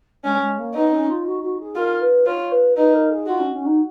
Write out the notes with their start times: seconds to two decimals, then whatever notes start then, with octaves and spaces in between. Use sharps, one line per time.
0.24 G#3 C#4
0.41 G#3
0.58 A#3
0.74 B3 D#4
0.92 C#4
1.08 F4
1.26 F#4
1.42 F#4
1.59 G#4
1.76 F4 A#4
2.01 B4
2.26 F4 C#5
2.51 B4
2.76 D#4 B4
2.93 A#4
3.10 G#4
3.27 F4 F#4
3.39 C#4
3.52 C#4
3.65 D#4